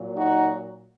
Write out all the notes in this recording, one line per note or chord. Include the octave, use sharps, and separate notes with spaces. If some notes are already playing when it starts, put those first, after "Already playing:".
Already playing: A#2 F#3 A#3
D#4 F#4